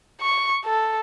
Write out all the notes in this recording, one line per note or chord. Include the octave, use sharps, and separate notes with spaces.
C#6
A4